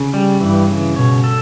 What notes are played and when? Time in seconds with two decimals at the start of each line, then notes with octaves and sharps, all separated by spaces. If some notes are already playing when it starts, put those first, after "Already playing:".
Already playing: C#3
0.14 G3
0.40 G2 E3
0.68 C#3
0.96 B2 C#5
1.24 A4